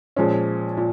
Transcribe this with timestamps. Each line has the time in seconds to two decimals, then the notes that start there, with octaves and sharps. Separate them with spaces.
0.16 A#2 F3 G#3 C#4
0.77 A#2